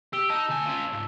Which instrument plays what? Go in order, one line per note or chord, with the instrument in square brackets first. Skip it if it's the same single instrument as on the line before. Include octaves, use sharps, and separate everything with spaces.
[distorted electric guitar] G4 [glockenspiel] E6
[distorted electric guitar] D#4 [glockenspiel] A5 E6 E7
[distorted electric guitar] D2 G#5
C#4 F4
C#2 G#2